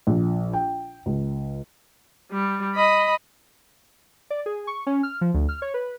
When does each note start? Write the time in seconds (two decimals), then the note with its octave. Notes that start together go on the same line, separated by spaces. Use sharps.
0.07 A#1
0.53 G5
1.06 C#2
2.32 G3
2.75 D#5 B5
4.30 D5
4.46 G#4
4.67 C#6
4.87 C#4
5.03 F6
5.21 F3
5.34 D2
5.49 F6
5.62 C#5
5.74 B4